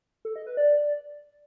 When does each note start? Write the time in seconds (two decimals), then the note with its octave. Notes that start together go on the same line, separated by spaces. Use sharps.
0.25 A4
0.36 D#5
0.46 B4
0.57 D5